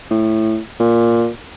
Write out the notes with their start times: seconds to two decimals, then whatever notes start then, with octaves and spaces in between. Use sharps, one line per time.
0.11 A2
0.80 A#2